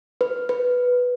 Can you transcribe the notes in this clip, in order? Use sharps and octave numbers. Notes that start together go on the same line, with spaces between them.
B4
B4